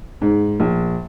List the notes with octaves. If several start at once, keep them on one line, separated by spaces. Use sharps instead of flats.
G#2
A#1